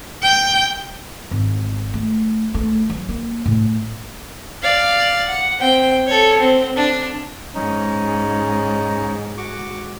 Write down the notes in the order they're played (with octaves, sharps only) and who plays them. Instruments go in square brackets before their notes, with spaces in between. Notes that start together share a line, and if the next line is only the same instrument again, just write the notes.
[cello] G5
[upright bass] G#1
A3
A3
F#3
A#3
A2
[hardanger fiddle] D5 F5
F#5
C4 G5
A4 C#5
C4
D4
[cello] G#2 [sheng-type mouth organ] C#4 D#4
[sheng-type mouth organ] F#4 C#6 D6